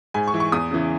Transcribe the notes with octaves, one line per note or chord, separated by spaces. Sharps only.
G#2 G#5
C#6
E3
C#6
E2 D#6
C#3 E3